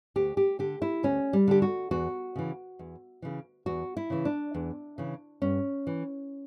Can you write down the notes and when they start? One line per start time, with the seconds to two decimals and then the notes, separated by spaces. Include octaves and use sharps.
0.16 D2 G4
0.37 G4
0.59 D3 G4
0.82 E4
1.03 D2 C#4
1.33 G3
1.47 D3 G4
1.62 F#4
1.91 E2 F#4
2.36 C#3 E3
2.79 E2
3.22 C#3 E3
3.66 E2 F#4
3.97 E4
4.10 C#3 E3
4.25 D4
4.54 E2
4.98 C#3 E3
5.42 G2 C#4
5.87 E3